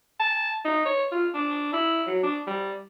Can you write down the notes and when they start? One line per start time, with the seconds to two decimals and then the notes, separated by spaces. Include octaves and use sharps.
0.20 A5
0.65 D#4
0.85 C#5
1.12 F4
1.34 D4
1.73 E4
2.07 F#3
2.23 D4
2.47 G3